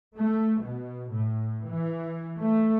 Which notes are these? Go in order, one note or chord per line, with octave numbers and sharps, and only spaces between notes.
A3
B2
A2
E3
A3